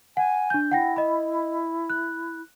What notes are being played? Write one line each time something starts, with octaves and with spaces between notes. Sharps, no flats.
F#5 G#5
D4 G6
E4 F#5 G5 A#6
D#5 B5
F#6